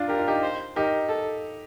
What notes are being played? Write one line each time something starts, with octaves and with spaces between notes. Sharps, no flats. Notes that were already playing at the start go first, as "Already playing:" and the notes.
Already playing: D4 F4
G4 A#4
F4
D#4 G4
C5
D#4 G4 A#4
A4